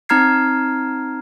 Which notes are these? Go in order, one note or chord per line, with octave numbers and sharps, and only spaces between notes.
C4 D#4 A#5 F6 G#6 C7